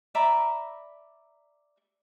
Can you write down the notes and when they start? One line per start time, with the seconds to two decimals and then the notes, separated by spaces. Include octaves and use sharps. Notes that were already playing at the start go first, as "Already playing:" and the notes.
0.15 D5 E5 A#5 B5